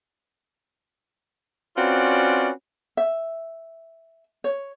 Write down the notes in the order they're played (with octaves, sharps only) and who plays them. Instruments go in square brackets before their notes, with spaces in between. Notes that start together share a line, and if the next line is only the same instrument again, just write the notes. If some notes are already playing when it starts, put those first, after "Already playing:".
[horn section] C4 C#4 F4 F#4 B4 D5
[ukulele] E5
C#5